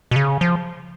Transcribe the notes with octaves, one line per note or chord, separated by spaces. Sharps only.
B2
C#3
F3